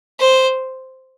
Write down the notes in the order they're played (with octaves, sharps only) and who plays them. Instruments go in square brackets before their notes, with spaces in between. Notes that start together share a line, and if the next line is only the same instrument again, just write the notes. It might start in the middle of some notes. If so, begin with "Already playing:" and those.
[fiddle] C5